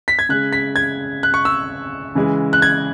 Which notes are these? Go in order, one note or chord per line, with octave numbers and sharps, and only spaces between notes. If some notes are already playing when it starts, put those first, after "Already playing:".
B6
G#6
C#3 G#3 F#6
B6
G#6
F#6
C#6
E6
C#3 E3 G#3
F#6
G#6